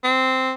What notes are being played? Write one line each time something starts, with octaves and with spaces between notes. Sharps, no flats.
C4